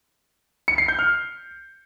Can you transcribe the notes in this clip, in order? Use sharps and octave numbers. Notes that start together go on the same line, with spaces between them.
C#7
C7
G6
F6